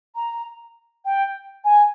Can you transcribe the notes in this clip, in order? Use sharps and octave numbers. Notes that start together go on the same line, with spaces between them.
A#5
G5
G#5